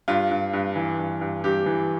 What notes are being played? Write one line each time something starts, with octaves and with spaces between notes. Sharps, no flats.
G2 F4
G2
G2
E3
G2
G2
G2 G4
E3